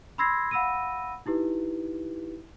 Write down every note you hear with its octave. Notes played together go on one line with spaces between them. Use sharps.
B5 C6 E6 G#6 A#6 C7
F5 F#5 B5 E6 A#6 D#7
D#4 E4 G4 B4